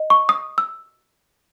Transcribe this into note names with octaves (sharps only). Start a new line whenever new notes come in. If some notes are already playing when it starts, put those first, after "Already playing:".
Already playing: D#5
C#6
D#6
E6